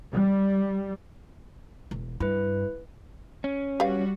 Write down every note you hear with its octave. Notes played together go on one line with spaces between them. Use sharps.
G3
E1
G2 E4 B4
C#4
G3 F#4 G4 B4 F5